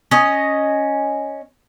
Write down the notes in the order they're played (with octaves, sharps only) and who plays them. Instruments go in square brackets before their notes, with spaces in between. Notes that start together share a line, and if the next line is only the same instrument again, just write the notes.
[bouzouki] C#4 D#5